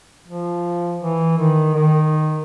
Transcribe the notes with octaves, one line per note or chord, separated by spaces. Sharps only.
F3
E3
D#3
D#3